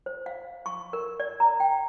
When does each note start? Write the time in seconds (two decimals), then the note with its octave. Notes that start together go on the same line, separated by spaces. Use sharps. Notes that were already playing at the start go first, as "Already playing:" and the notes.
0.06 C5
0.26 F5
0.66 C#6
0.93 A#4
1.20 D5
1.40 A#5
1.60 G5